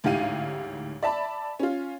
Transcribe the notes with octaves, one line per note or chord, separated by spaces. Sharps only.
A1 D2 G#2 G4 F5 D#7
D5 E5 A5 B5
C#4 F4